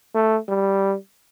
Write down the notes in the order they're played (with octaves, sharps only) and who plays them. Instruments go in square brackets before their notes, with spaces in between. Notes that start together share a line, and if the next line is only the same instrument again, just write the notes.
[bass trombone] A3
G3